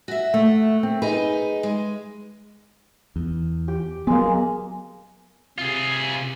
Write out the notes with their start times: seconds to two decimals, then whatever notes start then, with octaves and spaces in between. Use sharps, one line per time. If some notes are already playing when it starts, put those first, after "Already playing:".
0.08 F#4 E5
0.34 A3
0.83 C4
1.02 D#4 G#4 B4
1.63 G#3
3.16 E2
3.68 G4
4.07 F#3 G#3 A#3 B3
5.58 C3 F4 G#4